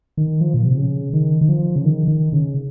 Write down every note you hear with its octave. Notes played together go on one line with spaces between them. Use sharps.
D#3
F3
A#2
C3
C#3
D#3
D#3
F3
C#3
D#3
D#3
C#3